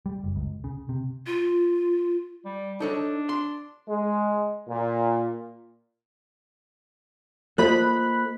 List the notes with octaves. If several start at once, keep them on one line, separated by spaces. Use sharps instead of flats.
G3
F#1
C#2
C#3
C3
F4
G3
D4 D#4 A4 C#5
C6
G#3
A#2
A#3 F4 A4 C5 D#5 B5 F#6